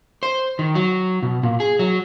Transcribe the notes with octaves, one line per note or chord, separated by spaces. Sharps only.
C5
D#3
F#3
B2
A#2
G#4
F#3